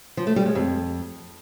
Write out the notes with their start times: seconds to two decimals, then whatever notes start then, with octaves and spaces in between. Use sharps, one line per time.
0.17 F3
0.27 A3
0.36 G3
0.46 G#3
0.55 F2